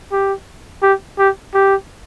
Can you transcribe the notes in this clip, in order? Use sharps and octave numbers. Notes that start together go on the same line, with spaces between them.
G4
G4
G4
G4